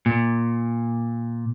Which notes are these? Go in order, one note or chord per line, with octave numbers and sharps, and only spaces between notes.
A#2